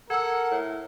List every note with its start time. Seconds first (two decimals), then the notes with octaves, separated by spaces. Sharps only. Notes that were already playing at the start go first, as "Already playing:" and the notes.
0.10 A4 A#4 F#5 E6 G#6
0.51 A2